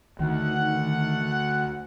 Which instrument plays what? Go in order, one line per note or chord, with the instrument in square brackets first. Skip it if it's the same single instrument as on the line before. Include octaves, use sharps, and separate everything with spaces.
[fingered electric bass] D2 [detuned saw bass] D#3 [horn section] F#5